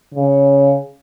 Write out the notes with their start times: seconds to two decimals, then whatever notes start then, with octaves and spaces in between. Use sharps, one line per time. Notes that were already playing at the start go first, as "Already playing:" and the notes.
0.14 C#3